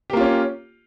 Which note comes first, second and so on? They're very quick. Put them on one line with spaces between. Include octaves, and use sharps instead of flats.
G4 A#3 F4 C#4